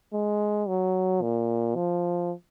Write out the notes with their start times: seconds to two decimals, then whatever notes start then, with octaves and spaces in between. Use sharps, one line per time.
0.13 G#3
0.68 F#3
1.22 A#2
1.76 F3